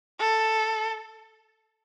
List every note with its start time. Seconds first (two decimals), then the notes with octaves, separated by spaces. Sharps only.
0.19 A4